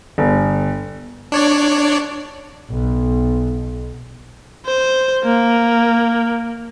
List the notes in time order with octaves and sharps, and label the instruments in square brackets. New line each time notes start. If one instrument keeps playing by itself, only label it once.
[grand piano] G1
[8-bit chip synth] D4 C#5 D5
[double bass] B1
[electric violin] C5
A#3